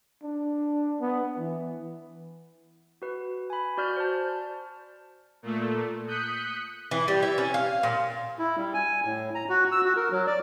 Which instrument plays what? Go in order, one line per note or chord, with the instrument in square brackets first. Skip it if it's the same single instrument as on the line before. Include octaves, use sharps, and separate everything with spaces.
[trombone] D4
B3
E3
[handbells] F#4 B4
G#5 B5
F#4 D5 F6 G6
C5 A5
[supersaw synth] A#2 A3
D#6 F#6 G6 B6 C#7
[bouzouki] E3
G3
E4
C#4
F5
A#2
[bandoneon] E4
G3
G#5
A2
A#5
F#4
E6
F#4
A#4
F#3
D5